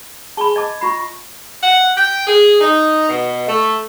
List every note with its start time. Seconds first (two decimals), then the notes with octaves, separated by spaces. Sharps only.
0.37 G#4 G#5 A5 B5 G7
0.56 D#5 A5 D6 G#6
0.81 F4 B5 C#6 A#6 C7
1.63 F#5
1.98 G5
2.27 G#4
2.61 D#4
3.09 B2
3.48 A3